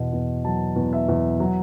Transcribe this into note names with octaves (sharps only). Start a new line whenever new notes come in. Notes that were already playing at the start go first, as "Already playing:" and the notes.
Already playing: E2 B2
E2
F#3 A5
E2
E5
E2
F#3